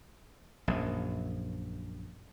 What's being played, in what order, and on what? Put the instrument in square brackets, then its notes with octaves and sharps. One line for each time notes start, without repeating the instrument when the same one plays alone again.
[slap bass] A#1 F#2